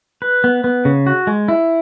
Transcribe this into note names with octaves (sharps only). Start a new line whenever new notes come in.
B4
B3
B3
C#3
F#4
G#3
E4